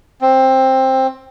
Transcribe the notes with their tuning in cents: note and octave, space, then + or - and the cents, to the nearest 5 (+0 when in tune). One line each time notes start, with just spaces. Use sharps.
C4 +10